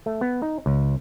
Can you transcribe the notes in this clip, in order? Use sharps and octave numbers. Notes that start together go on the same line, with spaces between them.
A3
B3
D#4
C#2